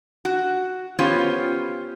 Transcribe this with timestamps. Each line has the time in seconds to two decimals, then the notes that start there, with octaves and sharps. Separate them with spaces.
0.25 F#4
0.99 B3 C#4 F4 G4 C5 C#5